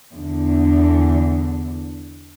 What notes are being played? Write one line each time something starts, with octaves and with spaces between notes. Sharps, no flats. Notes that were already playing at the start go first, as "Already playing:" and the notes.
E2 D3